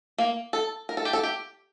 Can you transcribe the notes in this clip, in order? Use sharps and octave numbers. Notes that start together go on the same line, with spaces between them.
A#3
A4
A#4
A4
G4
A4
G4